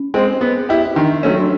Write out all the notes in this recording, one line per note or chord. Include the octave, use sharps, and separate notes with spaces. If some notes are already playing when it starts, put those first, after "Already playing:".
Already playing: C#4
G#3 C4
B3
E4 G4
D#3 D4
F#3 A3 C#4
D4